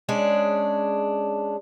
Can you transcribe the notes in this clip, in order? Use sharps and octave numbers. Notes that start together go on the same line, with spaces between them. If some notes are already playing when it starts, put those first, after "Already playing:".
G#3 C#4 D4